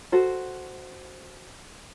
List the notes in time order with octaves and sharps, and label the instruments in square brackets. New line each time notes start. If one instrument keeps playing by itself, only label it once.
[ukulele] F#4 A4 C5